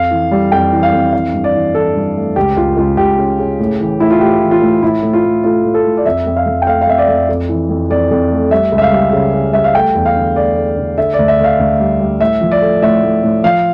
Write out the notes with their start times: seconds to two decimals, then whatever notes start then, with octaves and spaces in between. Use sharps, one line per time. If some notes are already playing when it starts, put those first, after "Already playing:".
Already playing: F2 F5
0.11 E3
0.31 G3
0.52 F2 G5
0.73 E3
0.83 F5
0.93 F2
1.13 E3 F5
1.33 G2
1.44 D5
1.55 E3
1.75 E3 A4
1.95 G2
2.16 A3
2.36 C#2 G4
2.57 C#2 F4
2.77 C#2 F4
2.97 C#2 G4
3.18 C#3
3.39 C#3
3.59 A2
3.80 E3
4.00 A2 E4
4.10 F4
4.21 A2 G4
4.41 E3
4.51 F4
4.62 A2
4.82 A2 E4
5.03 A2
5.13 F4
5.24 A2
5.44 A3 F4
5.65 A2
5.74 A4
5.85 A2
5.97 D5
6.06 F2 E5
6.27 F2
6.36 F5
6.46 F2
6.62 G5
6.67 A3 F5
6.81 F5
6.87 F2 E5
6.98 D5
7.08 F2
7.29 F2
7.49 E3
7.69 F2
7.90 F2 D5
8.11 F2
8.31 A3
8.51 G3 E5
8.72 C#2
8.78 E5
8.82 F5
8.92 G3
9.13 C#3
9.33 C#3
9.53 G3 E5
9.64 F5
9.75 A3 G5
9.95 E2
10.05 F5
10.16 D3
10.36 A3 D5
10.56 A3
10.77 D3
10.98 D3 E5
11.14 D2 D5
11.28 E5
11.39 D2 F5
11.59 D2
11.80 G3
12.00 G3
12.20 A2 E5
12.41 F3
12.52 D5
12.62 A3
12.82 A2 E5
13.03 A2
13.23 A2
13.44 F3 F5